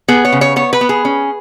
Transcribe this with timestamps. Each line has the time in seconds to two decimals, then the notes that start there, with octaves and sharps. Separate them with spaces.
0.08 B3 G#4
0.25 C#5
0.32 C#3
0.41 C#5
0.56 B3 C#5
0.73 B4
0.81 B3
0.89 G#4
1.05 C#4